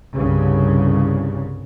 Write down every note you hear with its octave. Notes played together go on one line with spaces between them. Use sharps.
C2 G2 C#3